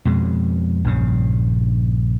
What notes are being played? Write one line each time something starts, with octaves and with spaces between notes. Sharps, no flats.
F2 B2 G#3
A#1 G2 C#3